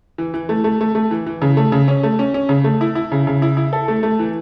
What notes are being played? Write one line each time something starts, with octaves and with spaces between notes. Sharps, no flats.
E3
E3
A3
A3
A3
A3
E3
E3
C#3
A3
C#3
C#4
A3
C#4
C#4
C#3
A3
E4
E4
C#3
C#3
E4
E4
A4
A3
A3
E3